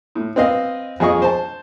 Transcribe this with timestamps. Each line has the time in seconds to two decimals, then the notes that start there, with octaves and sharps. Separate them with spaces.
0.15 A2
0.36 C4 B4 D#5 F5
1.00 F2 G#4 D#5 C#6
1.22 C5 A5